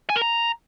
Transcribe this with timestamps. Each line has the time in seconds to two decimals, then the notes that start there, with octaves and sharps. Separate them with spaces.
0.10 G#5
0.16 A#4
0.22 A#5